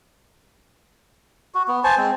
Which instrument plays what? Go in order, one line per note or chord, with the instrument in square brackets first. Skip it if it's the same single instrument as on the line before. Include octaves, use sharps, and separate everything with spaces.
[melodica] F#4
B3
C5 G#5 A5
G#3 C4